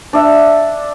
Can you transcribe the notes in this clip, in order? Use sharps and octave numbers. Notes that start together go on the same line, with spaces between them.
D4 E5